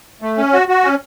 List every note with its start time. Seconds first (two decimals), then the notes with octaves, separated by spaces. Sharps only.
0.22 A3
0.37 C#4
0.53 F#4
0.68 F#4
0.84 C#4